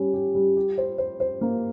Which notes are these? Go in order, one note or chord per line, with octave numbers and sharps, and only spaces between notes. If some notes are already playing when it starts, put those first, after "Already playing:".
Already playing: G3 C#4
G4
G3
G4
C5
C5
C5
A#3